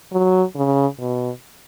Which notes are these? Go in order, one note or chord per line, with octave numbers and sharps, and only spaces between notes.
F#3
C#3
B2